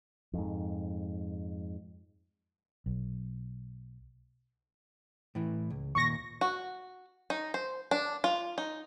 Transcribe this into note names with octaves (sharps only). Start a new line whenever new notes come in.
F2 G#2
B1
A2 E3
C#2
D#2 A#2 C#6 A#6
F#4
D#4
C5
D4
F4
D#4